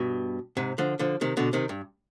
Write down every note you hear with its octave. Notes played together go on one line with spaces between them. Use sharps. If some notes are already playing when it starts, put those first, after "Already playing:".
Already playing: G2 B2
G#2 C3
D3 F3
D3 F3
C3 D#3
B2 D3
C3 D#3
G2